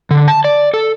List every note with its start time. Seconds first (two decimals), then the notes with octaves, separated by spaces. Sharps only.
0.11 D3
0.28 A5
0.44 D5
0.74 A4